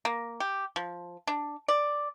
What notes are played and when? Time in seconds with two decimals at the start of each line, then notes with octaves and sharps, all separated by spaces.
0.05 A#3
0.40 G4
0.76 F3
1.27 D4
1.68 D5